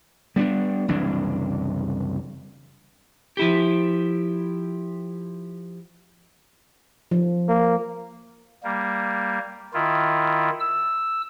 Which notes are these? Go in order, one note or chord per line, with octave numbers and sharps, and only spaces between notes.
G3 B3 C4 D4
F#1 C2 E3 D4
F3 E4 G4
F3
A#3
G3 A#3
D#3 E4 F4
E6